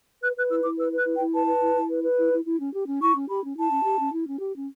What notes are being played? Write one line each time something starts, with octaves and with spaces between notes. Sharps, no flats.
B4 F#6
B4 F#6
E4 E6
E4 D6
B4 E6
B4 F#6
E4
G5
E4
B4 A5
B4
E4
E4
B4
B4
E4
E4
E4
C#4
G4
C#4
E4 C#6
C#4
G4 B5
C#4
E4 A5
C#4
G4
C#4
E4
C#4
G4
C#4